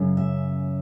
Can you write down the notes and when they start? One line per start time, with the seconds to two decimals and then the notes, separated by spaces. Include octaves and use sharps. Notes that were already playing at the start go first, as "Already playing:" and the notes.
Already playing: F#2 C#3
0.17 E5